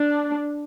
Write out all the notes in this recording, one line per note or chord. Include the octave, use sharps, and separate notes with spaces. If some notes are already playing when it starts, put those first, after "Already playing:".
Already playing: D4